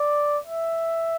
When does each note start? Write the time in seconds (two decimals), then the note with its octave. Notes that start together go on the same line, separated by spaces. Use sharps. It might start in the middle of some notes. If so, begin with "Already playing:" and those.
Already playing: D5
0.46 E5